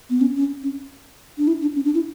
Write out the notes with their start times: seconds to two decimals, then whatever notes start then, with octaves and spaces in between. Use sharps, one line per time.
0.10 B3
0.21 C#4
0.35 C#4
0.63 C#4
1.38 D4
1.47 E4
1.61 D4
1.75 C#4
1.85 D4
1.94 E4